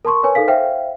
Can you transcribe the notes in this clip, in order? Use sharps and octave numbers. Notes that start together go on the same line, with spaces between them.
A#4 A5 C6 C#6
A#4 B4 C#5 G#5
D#4 A4 A#4 F5 B6
C5 E5 F5 G5